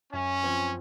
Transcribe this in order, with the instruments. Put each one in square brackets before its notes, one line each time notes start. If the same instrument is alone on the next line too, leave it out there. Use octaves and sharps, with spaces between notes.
[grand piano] F#2 [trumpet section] C#4
[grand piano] F3 C4 F4